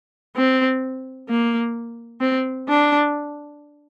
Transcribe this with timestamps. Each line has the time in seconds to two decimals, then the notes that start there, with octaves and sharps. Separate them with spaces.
0.37 C4
1.29 A#3
2.21 C4
2.68 D4